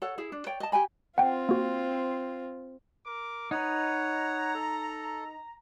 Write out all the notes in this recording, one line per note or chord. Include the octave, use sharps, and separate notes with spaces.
A4 C#5 F#5
E4 G#4
D4
C#5 D5 G5
D#5 A5
G4 G5 G#5 B5
C4 F4 F#5 G5
A#3 F#4
A#4 D6
D#4 B4 C#5 F#5 A#5
A4